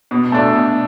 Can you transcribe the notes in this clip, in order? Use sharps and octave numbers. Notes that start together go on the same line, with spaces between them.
B2
A3 D4
B2